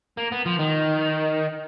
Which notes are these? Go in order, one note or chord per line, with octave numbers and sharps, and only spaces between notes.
A#3
B3
F3
D#3